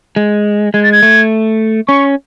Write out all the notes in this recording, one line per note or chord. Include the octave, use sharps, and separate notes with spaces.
G#3
G#3 G#6
A6
G#6
A3
C#4 C#6